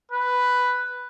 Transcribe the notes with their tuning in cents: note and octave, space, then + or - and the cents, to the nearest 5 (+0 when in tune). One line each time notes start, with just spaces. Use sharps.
B4 +5